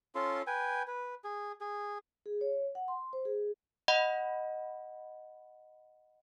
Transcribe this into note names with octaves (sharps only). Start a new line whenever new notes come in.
C#4 F4 A4 C6
B4 G5 G#5
B4
G#4
G#4
G#4
C#5
F#5
C6
C5
G#4
D#5 F#5 B5